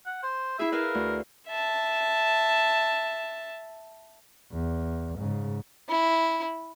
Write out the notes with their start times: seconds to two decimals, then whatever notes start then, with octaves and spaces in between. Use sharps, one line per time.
0.06 F#5
0.23 C5
0.59 E4 G#4 E5
0.72 A#4 B4 E5 F5
0.95 D2
1.48 E5 A5
4.52 E2
5.19 G#2 C#3
5.89 E4